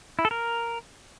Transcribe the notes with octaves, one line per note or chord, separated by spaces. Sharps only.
E4
A4
A#4